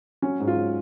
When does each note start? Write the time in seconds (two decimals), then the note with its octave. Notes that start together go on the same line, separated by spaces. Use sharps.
0.22 F#3 C#4
0.40 G#2
0.47 F4
0.56 F#3